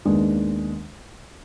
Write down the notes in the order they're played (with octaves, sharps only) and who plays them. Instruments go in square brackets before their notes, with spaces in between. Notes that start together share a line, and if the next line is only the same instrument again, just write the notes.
[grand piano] D#2 D#3 G#3 B3 D4